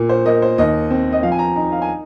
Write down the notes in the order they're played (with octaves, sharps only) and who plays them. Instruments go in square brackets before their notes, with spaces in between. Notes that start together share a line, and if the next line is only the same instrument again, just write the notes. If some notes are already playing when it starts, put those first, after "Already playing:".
Already playing: [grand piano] A#2
C5
A#3 D#5
C5
D#2 D#5
C4
D#5
F3 F5
G#5
A#5
D#4 A#5
F5
G#5